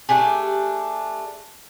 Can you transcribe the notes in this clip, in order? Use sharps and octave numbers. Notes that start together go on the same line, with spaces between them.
A3 D4 G4 G#4